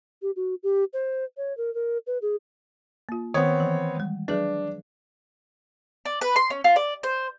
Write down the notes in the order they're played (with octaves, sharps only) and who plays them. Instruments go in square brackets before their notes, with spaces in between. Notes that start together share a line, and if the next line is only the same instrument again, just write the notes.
[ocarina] G4
F#4
G4
C5
C#5
A#4
A#4
B4
G#4
[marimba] A#3 F4
[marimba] D#3 [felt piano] B3 C4 C#5
[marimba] E3
G3 G#3
[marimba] F#3 G#4 B4 [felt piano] D4
[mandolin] D5
B4
C6
C#4
F4
D5
C5